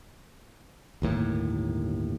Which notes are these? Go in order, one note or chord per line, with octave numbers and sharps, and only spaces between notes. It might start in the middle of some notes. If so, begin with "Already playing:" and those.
G1 D#2 A2 A#3